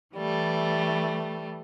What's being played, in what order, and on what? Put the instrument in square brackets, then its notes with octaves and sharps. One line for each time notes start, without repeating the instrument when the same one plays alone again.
[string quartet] E3 G3 A3